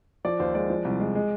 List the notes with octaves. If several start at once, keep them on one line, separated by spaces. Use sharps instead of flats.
F3 D5
D#2 C5
G#3 D5
F3
C2
G#3
G#3